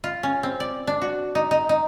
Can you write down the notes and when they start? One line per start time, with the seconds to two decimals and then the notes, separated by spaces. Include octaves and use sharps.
0.04 F4
0.23 C#4
0.43 C4
0.60 D5
0.87 D4
1.02 F#4
1.35 D#4
1.51 D#4
1.69 D#4